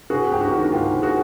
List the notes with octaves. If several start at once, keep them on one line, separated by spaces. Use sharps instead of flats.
C3 F#4 G#4
C#2 G4
F#4
D#3
F#4
C#2 F4 G4
C3
F#4 G#4